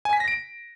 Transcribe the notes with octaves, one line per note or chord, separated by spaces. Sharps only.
G#5
B6
A#6
D7